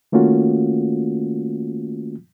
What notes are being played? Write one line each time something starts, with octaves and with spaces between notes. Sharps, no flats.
D#3 A3 A#3 C#4 F4 F#4